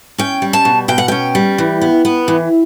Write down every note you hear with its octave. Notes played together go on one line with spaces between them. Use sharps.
C#4 G5
G3
A5
B2
B2 G5
F#5
C#4 G5
G3
E3
B3
B3
E3